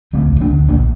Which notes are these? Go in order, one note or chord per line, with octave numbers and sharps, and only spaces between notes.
D2 A3 C4
D2
A#3 D4
D2
A#1 A#3 D4